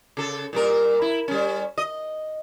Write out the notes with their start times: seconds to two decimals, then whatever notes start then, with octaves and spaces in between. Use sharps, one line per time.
0.17 C#3 A4
0.53 A#2 G3 A#4
1.02 E4
1.28 G3 C#4
1.78 D#5